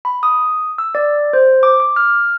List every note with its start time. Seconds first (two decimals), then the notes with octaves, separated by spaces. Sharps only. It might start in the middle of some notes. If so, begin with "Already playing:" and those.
0.05 B5
0.23 D#6
0.78 E6
0.95 D5
1.33 C5
1.63 D6
1.80 D6
1.96 F6